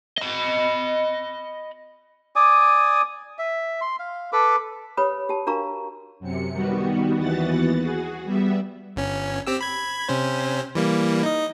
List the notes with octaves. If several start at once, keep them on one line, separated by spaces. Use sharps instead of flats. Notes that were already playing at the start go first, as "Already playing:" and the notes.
D#5 B5
D5 G#5 D6 D#6
E5
C6
F5
A4 B4 B5 D6
G4 B4 C#5 B5 D#6
G4 A5
D4 F#4 A#4 F5 A#5 C#6
F#2 C3 C#7
D#3 G3 B3 F#4
D#2 E3 B3 F#4 F#5 A6
F#4 G#4
G3 B3 E5
G1 C#4
C4 G4 E6
B5 G#6
C3 C#4 C5
E3 G3 A#3
D#4 D#5